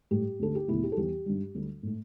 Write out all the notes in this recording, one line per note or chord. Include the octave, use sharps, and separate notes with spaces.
A2 G3 G4
D2 D3 A3 A4
G4
E2 B2 A3 E4
G4
A4
E2 E3 G3 G4
G2 G3
D2 D3 G3
A2 A3